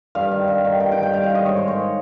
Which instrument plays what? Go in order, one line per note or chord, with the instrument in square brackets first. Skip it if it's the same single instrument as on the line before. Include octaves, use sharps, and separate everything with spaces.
[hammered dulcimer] G2 F5
D#3
G2
D#3
G2 G5
G5
D#3
G5
G2 F5
F5
D#3
D#5
G#2 C#5
C5
D#3
C#5